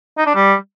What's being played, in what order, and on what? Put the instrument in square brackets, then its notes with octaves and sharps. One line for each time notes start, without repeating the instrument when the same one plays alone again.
[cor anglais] D#4
D4
G3